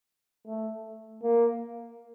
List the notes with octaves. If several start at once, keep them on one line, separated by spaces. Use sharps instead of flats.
A3
A#3